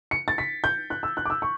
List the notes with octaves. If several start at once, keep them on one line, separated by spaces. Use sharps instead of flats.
C#7
A6
B6
G6
F#6
E6
F#6
D6
E6
C#6